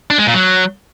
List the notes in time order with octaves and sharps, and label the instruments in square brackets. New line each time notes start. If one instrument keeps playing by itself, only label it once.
[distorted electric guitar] D4
G#3
A#2
F#3